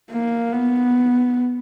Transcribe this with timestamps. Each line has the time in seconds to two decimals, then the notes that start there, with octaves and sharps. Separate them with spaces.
0.11 A#3
0.53 B3